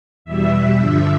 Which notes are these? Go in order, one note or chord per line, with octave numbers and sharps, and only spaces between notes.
E2 B2 G3 E5
G2 D3 F3 E5